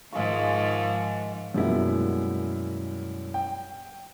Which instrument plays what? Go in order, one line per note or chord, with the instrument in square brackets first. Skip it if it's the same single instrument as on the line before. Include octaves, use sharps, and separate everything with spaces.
[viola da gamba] G#2 D#3 F3 [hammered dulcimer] G#3 C#6 [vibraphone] F5 D6
[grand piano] F#2 B2 G3 G#3 A#3 E4
G5